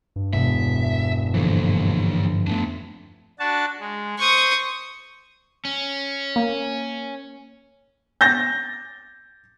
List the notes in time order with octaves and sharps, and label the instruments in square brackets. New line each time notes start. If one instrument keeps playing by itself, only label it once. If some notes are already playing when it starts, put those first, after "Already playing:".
[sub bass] G2
[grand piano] E1 [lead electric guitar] E5
[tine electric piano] G#2 D3 F3 [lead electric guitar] E3 A#3
[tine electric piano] F2 A3 [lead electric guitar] B3 D4
[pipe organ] D4 F#4 A5
G#3
[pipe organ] C5 [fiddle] C#6 D#6
[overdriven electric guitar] C#4
[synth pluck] A#3
[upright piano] G6 A6 A#6